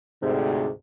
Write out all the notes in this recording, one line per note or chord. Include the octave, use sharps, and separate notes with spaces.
D2 G#2 C3